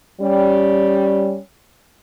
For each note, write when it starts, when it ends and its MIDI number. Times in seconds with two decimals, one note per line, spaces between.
0.21 1.39 55
0.21 1.39 61